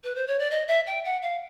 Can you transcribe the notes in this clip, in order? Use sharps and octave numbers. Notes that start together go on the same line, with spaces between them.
B4
C5
C#5
D5
D#5
E5
G5
F#5
F5